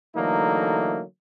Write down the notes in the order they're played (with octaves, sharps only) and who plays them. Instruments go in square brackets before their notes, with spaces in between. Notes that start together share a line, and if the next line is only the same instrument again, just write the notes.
[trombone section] D3 E3 F#3 A3 A#3 D#4